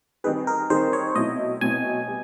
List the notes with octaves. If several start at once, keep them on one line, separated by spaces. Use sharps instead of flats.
D#3 G3 C4 D#4 G#4 B4
A#4
D#3 G3 C4 D#4 G#4 C5
C#5
B2 F#3 A3 C4 E4 D#5
B2 F#3 A3 C4 E4 G#5
G3 B3